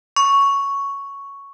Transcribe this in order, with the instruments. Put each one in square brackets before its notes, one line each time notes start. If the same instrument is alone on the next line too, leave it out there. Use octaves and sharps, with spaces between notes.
[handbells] C#6